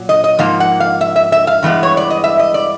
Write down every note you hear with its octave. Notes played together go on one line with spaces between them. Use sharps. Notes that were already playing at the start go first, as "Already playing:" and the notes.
Already playing: A#2 F#3
D#5
D#5
G#2 F3 A#3 F5
F#5
F5
E5
E5
E5
F5
G2 E3 G#3 B3
C#5
D5
D#5
E5
D#5
D5